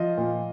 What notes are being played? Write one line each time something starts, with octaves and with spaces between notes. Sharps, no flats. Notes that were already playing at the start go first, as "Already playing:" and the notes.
Already playing: F3 D#5
A#2